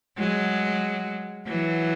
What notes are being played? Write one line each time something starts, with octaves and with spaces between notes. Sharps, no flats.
F#3 G#3
E3 F#3